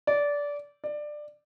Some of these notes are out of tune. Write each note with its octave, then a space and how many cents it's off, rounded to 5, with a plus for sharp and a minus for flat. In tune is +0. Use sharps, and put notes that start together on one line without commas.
D5 -20
D5 +15